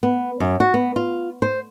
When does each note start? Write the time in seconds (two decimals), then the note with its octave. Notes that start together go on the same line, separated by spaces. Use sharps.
0.03 B3
0.40 F#2
0.60 F#4
0.74 B3
0.96 F4
1.42 C5